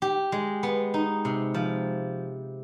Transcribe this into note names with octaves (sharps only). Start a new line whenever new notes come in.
G4
G#3
B3
D#4
C3
F3